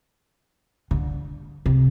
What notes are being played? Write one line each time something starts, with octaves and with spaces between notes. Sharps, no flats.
D3
C3